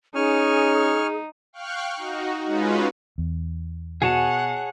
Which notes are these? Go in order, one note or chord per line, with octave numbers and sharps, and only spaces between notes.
C#4 D#4 G#4 G#5 C#6 F6
F5 G5 C#6 F6 F#6
D#4 F#4
G#3 C#4 D#4 F4 F#4 B4
E2
B2 F#4 G#4 C#5 F#5 G#5 A5